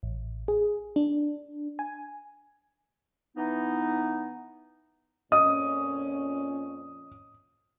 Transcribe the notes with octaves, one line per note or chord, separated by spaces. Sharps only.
A1
G#4
D4
G#5
E3 B3 D#4
F2 A#2 C#4 D#5 D#6